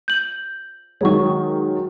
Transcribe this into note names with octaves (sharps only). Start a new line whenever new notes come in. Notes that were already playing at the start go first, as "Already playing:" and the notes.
G6 F#7
D#3 F#3 G#3 C#5 C#6